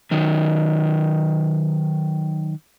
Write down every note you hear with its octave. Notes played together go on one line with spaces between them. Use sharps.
D#3 F#3